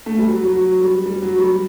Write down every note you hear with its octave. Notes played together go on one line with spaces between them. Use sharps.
A3
G3
F#3
F#3
F#3
G3
G3
F#3
G3